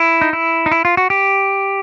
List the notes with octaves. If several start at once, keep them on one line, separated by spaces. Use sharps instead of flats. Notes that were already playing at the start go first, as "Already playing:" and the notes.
Already playing: E4
D#4
E4
D#4
E4
F4
F#4
G4